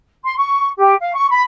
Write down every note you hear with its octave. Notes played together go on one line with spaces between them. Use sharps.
C6
C#6
G4
F5
C#6
B5